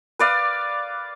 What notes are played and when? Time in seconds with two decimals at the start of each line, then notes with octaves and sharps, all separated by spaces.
0.19 B4 D5 F5